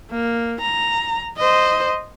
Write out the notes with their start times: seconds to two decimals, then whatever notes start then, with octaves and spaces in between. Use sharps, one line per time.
0.11 A#3
0.61 A#5
1.37 C5 D#5